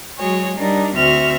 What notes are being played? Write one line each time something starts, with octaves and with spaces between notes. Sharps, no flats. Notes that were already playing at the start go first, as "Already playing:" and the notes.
F#3 G#3 F#4 G#4 C#5
G3 D4 D#4 A#4
D2 C4 F#4 E5 F6